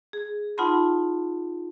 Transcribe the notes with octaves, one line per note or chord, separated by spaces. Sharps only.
G#4
D#4 F4 F#5 A5 B5 C6